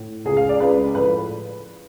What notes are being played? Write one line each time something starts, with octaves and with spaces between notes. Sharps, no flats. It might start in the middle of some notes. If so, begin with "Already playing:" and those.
Already playing: A2
C#2 C#3 G#3 G#4
F5
D5
C#2 C#3 G#3 B4
A2 F3 A3 B4